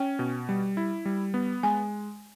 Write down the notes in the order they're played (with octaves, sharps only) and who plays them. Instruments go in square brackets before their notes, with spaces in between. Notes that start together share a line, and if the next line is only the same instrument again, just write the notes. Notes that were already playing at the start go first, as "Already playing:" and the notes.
Already playing: [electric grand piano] C#4 [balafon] G5
[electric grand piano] B2
G3
E4
G3
B3
[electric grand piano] G#3 [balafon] G#5